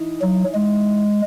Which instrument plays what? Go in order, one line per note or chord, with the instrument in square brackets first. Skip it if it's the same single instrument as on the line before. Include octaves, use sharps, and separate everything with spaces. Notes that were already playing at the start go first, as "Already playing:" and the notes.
Already playing: [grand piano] E3 D#4
[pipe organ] F#3
G#3